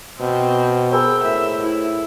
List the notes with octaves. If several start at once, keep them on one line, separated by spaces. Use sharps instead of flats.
B2 C4
G#4 A#4 C5 G5 B5 E6
A2 E5
E4